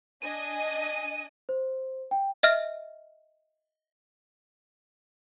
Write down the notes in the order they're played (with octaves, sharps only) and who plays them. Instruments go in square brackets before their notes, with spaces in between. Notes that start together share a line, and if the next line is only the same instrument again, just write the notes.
[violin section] D4 D#5 G#5 [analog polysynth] D#7
[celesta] C5
G5
[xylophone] D#5 E5 F6